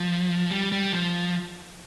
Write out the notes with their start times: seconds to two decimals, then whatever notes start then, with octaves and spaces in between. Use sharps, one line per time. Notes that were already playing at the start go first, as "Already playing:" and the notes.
Already playing: F3
0.51 G3
0.72 G3
0.93 F3